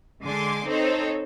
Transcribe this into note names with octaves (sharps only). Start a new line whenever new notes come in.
D3 G#3 G#5 C6 D6
C4 D#4 A4 C5 C#5